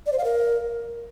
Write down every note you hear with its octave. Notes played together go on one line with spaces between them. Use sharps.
D5
C5
F5
A#4